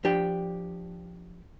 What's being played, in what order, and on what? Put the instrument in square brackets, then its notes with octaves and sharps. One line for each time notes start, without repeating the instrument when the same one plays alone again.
[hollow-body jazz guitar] F3 D4 G4 D5 G5